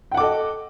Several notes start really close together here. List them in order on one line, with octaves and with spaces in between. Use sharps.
G5 F#5 D6 A4 D#5